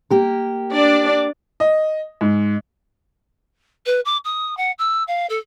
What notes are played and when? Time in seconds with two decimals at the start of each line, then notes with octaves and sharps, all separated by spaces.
0.10 A#3 G4 A#4
0.72 D4 D5
1.60 D#5
2.21 G#2
3.86 B4
4.05 D6
4.25 D#6
4.57 F#5
4.78 E6
5.08 F5
5.29 A4